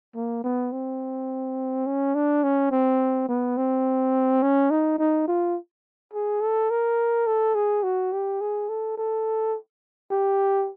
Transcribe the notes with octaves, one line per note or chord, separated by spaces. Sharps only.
A#3
B3
C4
C#4
D4
C#4
C4
B3
C4
C#4
D#4
D#4
F4
G#4
A4
A#4
A4
G#4
F#4
G4
G#4
A4
A4
G4